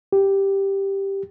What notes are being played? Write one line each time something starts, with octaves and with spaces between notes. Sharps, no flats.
G4